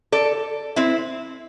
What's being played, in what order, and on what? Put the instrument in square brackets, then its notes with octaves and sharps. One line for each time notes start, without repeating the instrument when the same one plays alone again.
[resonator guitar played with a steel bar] A4 D5
C4 E4